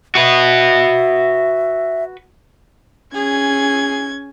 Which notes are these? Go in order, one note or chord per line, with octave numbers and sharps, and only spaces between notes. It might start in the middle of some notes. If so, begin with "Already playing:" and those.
F#4 B4 E5
C#4 G#4 G#6